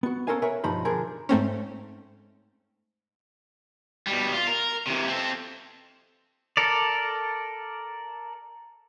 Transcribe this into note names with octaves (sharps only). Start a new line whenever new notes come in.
B3 F#4
C#4 A4 A#4 C5 F5 G#5
A#4 B4 C#5 E5 G#5
B1 G2 F3 D#4 B5
D3 F3 G#4 A#4
G#2 A3 C4 C#4
B2 G3
F4
A#4
C3 E3
C4 A4
A4 A#4 D5